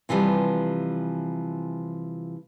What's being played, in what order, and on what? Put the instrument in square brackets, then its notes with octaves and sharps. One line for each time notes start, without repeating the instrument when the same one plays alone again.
[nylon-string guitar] C3 E3 F3 G3